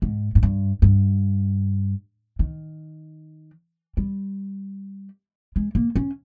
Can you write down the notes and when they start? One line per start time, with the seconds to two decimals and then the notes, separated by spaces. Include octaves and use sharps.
0.02 G#2
0.35 G#2
0.43 G2
0.82 G2
2.39 D#3
3.97 G3
5.56 G#3
5.75 A#3
5.96 C#4